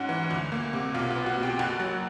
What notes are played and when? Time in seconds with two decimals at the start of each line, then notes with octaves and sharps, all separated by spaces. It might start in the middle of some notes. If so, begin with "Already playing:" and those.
Already playing: G#2 C#4 F#4 F#5
0.09 E3
0.30 D2
0.52 A#3
0.73 C3
0.94 B1 F4 F5
1.04 F#5
1.10 F4 F5
1.16 B3
1.26 F#4 F#5
1.37 B2
1.43 G4 G5
1.58 F#1 F#4 F#5
1.80 F#3